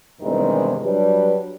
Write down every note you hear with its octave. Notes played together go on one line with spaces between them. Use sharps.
E2 G2 C3 D#3 G#3
F#3 G3 D4 B4